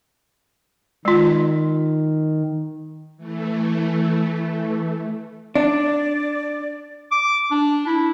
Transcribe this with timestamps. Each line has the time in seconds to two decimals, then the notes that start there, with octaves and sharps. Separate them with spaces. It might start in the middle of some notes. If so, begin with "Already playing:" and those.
1.05 D#3 G#3 F4
3.17 E3 A3
5.55 D4 D5
7.12 D6
7.51 D4
7.87 E4